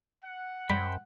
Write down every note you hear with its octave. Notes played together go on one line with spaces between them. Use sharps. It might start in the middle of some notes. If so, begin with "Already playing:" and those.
F#5
F#2 G3 C5 G5 B5